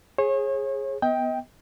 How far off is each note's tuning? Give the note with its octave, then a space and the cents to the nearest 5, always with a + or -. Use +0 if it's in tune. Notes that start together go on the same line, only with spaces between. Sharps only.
G#4 +0 C#5 -35
B3 +0 D#5 +35 G5 +5